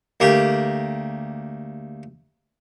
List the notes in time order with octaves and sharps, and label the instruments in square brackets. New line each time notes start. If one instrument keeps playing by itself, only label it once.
[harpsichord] D2 A#3 G4